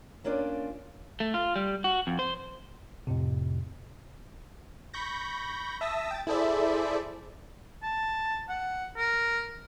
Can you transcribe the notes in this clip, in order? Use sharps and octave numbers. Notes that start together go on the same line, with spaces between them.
A#3 C#4 D4 F4 D5
A3
F4
G3
F#4
F2
C5
F2 A2 C3
B5 C#6 G6 A#6
E5 A5 D#6 E6 A#6
G5 A6
E4 G#4 A4 C5 D5 E5
A5
F#5
A#4